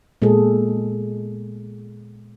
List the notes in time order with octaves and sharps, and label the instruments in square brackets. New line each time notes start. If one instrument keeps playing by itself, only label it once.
[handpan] A#2 G#3 B3 G#4 A4